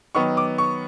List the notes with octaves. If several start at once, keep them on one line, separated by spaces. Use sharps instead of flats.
D#3 F#3 B3 C#6
D6
C#6